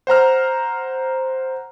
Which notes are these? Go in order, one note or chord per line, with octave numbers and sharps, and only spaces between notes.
C5 F#5 A#5 F6